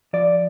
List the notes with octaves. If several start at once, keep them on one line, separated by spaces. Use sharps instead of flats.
F3 D5